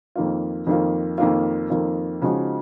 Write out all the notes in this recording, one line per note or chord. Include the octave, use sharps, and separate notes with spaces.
F2 D#3 A#3 F4
F2 D#3 A#3 F4
F2 D#3 A#3 F4
F2 D#3 A#3 F4
C#3 F3 G#3 D#4 F#4